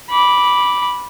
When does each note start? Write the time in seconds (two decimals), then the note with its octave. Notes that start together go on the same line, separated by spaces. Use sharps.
0.10 B5 D6